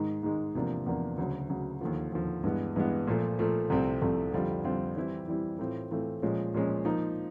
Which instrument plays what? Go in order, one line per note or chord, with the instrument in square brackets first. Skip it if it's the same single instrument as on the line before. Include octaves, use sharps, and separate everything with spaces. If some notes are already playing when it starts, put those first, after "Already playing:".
Already playing: [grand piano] G#2 D#3 G#3
G#2 D#3 G#3
E2 C3 F3 A#3 D4
E2 C3 F3 A#3 D4
D2 C#3 F#3
D2 C#3 F#3
D#2 D3 F3
D#2 D3 F3
G2 E3 G#3 B3
G2 E3 G#3 B3
A#2 F3 A3
A#2 F3 A3
C2 C3 F3 A3 C4
C2 C3 F3 A3 C4
F2 D3 G3 C4 F4
F2 D3 G3 C4 F4
E3 G3 C4 E4
E3 G3 C4 E4
A2 E3 A3 C4 F4
A2 E3 A3 C4 F4
A#2 F3 G#3 C#4
A#2 F3 G#3 C#4
F3 A#3 D#4